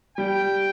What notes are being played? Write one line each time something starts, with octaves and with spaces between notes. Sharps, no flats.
G3 G5